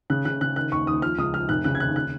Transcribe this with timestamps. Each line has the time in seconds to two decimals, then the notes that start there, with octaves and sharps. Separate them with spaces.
0.10 C#3 F#6
0.25 C#3 F#6
0.41 C#3 F#6
0.56 D#3 F#6
0.72 D#2 C#6
0.87 D#2 D#6
1.02 F3 F6
1.18 C#2 D#6
1.34 F3 F6
1.49 F1 F#6
1.64 C#3 F#6
1.75 G#6
1.80 D#2 F#6
1.96 F#6